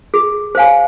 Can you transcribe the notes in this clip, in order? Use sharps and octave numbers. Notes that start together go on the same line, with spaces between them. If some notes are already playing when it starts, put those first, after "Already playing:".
G#4
C5 F5 G#5